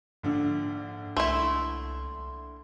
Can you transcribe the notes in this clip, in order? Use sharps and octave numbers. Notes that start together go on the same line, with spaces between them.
A#1 G#2 D3 D4
C2 A3 E4 C6